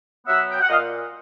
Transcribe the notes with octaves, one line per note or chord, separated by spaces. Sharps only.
F#3 B3 E5 F#5
G5
F#5
A#2 D#5 F5